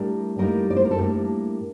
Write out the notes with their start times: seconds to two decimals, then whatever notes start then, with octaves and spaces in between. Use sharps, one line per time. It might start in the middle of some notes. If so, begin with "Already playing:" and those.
Already playing: A2 G3 D4 A#4
0.38 A2 G3 A#3 D#4 A#4
0.70 D5
0.77 C5
0.85 A#4
0.91 A4
0.98 A2 G3 A#3 D4 G4